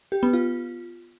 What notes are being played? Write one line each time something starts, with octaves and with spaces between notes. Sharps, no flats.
G4
B3
F4